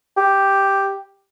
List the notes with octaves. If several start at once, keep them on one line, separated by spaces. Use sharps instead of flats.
G4